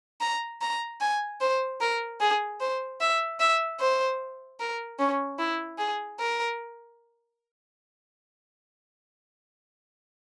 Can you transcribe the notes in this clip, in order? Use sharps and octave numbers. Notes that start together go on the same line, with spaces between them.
A#5
A#5
G#5
C5
A#4
G#4
C5
E5
E5
C5
A#4
C#4
E4
G#4
A#4